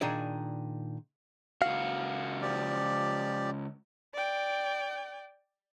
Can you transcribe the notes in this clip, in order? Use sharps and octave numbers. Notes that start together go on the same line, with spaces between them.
A#2 D#3 D4 G#4 D5
C#2 F#4 F5
F3 G4 D5
D5 G5